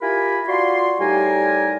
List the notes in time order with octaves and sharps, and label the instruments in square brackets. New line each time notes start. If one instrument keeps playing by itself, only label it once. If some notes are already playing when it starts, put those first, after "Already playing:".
[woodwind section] E4 F4 G4 A#4 G#5 B5
F4 F#4 D5 C6
A2 G3 D#4 G4 A#4 G#5